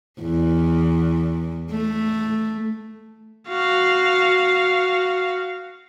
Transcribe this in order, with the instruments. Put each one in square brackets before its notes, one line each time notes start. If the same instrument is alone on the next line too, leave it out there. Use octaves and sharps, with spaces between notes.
[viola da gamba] E2
A3
[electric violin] F#4 F5